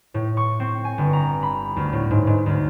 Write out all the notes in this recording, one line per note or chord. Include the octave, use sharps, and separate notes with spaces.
A2
C#6
C4
G#5
G1
A#5
B5
D2
A2
G#2
G#2
D2